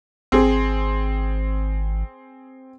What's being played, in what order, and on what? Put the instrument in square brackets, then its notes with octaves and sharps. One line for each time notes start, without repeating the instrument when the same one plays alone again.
[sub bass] G#1 [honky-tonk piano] C4 G#4